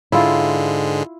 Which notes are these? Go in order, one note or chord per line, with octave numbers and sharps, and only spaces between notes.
G#2 D3 G#3 E4 F4